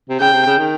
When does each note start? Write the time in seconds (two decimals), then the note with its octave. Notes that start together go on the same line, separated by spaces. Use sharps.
0.10 C3
0.20 C#3 G5
0.33 C3
0.46 C#3
0.58 D#3